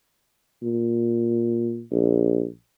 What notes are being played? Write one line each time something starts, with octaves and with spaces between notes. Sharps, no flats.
A#2
A#1